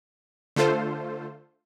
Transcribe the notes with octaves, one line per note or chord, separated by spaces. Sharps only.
D3 A3 F4 A4 C5